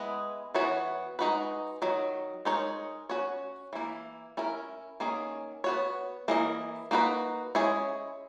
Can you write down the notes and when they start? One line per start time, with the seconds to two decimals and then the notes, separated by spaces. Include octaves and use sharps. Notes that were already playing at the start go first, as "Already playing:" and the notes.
Already playing: G#3 B3 E4 B4 D#5
0.54 E3 B3 F#4 C#5
1.19 G#3 D#4 F#4 B4
1.82 D#3 F#3
2.45 G#3 D#4 A#4 C#5
3.09 C#4 F#4 C#5
3.73 E3 A#3 E4
4.37 C#4 E4 A#4
5.00 D#3 A#3 C#4 G#4
5.64 B3 F#4 C#5
6.28 E3 A#3 E4 A#4 D#5
6.91 A#3 D#4 F#4 B4
7.55 G#3 C#4 E4 G#4 C#5